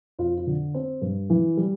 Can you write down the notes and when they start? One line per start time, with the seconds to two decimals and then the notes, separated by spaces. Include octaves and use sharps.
0.19 F2 F4
0.37 F4
0.47 D3
0.74 C4
1.02 G2
1.30 E3
1.57 G3